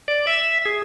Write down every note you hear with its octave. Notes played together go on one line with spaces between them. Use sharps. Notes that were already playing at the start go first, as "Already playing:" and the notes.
D5
E5
G#4